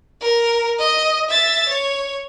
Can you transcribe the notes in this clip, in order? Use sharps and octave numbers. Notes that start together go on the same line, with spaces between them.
A#4
D#5
E5 A6
C#5